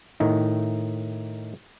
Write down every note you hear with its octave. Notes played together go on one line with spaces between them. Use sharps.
A2 D#3 D#4